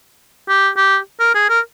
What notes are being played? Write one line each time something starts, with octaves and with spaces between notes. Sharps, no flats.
G4
G4
A#4
G#4
A#4